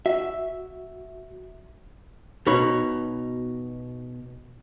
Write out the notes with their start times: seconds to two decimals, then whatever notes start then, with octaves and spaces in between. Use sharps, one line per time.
0.06 F#4 E5
2.46 B2 D#4 C#5 B5